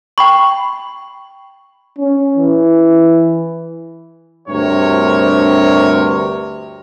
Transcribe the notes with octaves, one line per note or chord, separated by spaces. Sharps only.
G5 B5 C#6
C#4
E3
D2 G2 C3 A#4 C#5